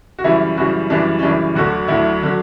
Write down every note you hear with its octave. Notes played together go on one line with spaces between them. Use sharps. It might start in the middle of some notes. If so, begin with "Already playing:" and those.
F#4
F#2 C#3 E3 G3 E4
F#2 C#3 E3 G3 F#4
F#2 C#3 E3 G3 D4
C#4
F#2 C#3 E3 G3 D4
D2 D3 F#3 F#4
D2 D3 F#3 E4
D3 F#3